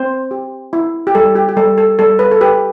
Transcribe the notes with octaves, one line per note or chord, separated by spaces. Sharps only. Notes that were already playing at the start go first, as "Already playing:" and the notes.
Already playing: C4 C5
G4
E4
G4
G3 A4
G4
G4
G3 A4
A4
G3 A4
B4
A4
G4 B4